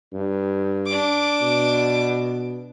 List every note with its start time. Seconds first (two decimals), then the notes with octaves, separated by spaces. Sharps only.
0.13 G2
0.87 D4 D6
1.41 B2